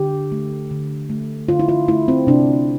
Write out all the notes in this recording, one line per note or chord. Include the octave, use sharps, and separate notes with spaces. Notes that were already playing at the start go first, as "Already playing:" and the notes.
Already playing: D3 G4
A3
D3
A3
D3 F4
E4
F4
A3 E4
C4
C3 D4